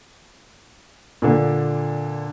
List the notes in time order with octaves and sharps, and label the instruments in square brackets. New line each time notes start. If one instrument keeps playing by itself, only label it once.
[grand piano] A#2 D3